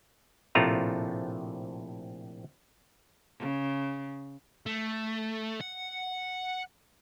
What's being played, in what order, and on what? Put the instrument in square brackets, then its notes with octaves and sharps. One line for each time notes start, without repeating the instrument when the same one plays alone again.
[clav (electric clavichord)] A#1 A2 C3 A3 F4 A#5
[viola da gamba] C#3
[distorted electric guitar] A3
F#5